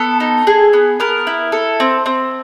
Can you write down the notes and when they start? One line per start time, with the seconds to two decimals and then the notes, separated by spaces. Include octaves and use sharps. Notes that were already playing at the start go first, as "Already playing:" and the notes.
Already playing: B3 A4
0.20 D#4
0.47 G#4
0.73 B3
1.00 B3 A#4
1.27 E4
1.52 A4
1.80 C4
2.06 C4